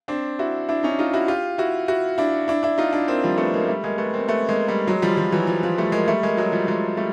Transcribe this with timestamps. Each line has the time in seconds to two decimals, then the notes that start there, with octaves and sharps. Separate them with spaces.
0.08 C4 D4
0.39 E4 F#4
0.69 D4 E4
0.83 C#4 D#4
0.99 D#4 F4
1.13 E4 F#4
1.28 F4 G4
1.58 E4 F#4
1.88 E4 F#4
2.18 D4 E4
2.48 D4 E4
2.63 D4 E4
2.78 D#4 F4
2.93 D4 E4
3.08 A#3 C4
3.23 F3 G3
3.38 A3 B3
3.54 G#3 A#3
3.68 G3 A3
3.84 G#3 A#3
3.98 A3 B3
4.14 A#3 C4
4.28 A3 B3
4.49 G#3 A#3
4.68 G3 A3
4.87 F#3 G#3
5.02 F3 G3
5.17 F3
5.32 E3 F#3
5.47 F3
5.63 F3
5.78 G3 A3
5.92 G#3 A#3
6.08 G3 A3
6.23 G#3 A#3
6.37 F#3 G#3
6.52 F3 G3
6.67 F#3 G#3
6.97 G3 A3